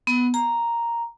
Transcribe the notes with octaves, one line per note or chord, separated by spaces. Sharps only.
B3
A#5